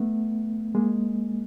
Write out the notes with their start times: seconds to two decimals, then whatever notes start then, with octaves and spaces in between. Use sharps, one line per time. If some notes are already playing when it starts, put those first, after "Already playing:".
Already playing: A3 B3
0.75 G#3 A#3